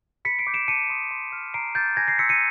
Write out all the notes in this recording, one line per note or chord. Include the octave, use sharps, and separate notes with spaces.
B5 B6 C#7
C7 D7
D6 G6
D7 E7
A5 C#7 D#7
C6 D#6
C6
F6
A#5 C7 D7
D6 F6 G6 A6
G#5 G#6 A#6
A#6 C7
C6 E6 B6 C#7
C#7 D#7